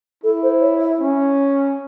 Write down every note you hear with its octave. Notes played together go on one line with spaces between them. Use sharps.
E4 A4
C5
C#5
E5
C#4